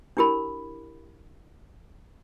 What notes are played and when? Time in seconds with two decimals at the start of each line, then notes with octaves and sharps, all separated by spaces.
0.17 D4 E4 G4 A#4 B5